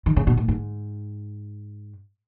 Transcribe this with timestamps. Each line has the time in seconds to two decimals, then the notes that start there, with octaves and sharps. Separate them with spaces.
0.06 D#3
0.16 C#3
0.27 B2
0.37 A2
0.48 G#2